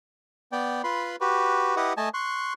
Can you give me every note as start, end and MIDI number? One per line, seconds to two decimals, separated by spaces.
0.52 0.82 59
0.52 0.82 74
0.52 0.82 79
0.84 1.16 65
0.84 1.16 71
0.84 1.16 83
0.84 1.16 84
1.21 1.76 66
1.21 1.76 67
1.21 1.76 71
1.76 1.93 64
1.76 1.93 67
1.76 1.93 71
1.76 1.93 75
1.76 1.93 78
1.97 2.09 57
1.97 2.09 75
1.97 2.09 80
1.97 2.09 81
2.14 2.53 84
2.14 2.53 85
2.14 2.53 90